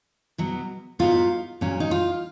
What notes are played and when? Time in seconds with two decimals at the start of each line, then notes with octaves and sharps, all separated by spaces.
0.38 B2 F#3 B3
0.99 G#2 F#3 B3 D#4 F4
1.61 A#2 F#3 C#4
1.80 D#4
1.91 F4